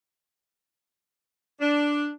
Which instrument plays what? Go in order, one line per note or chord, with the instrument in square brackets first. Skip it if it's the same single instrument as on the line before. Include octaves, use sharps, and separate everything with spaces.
[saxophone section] D4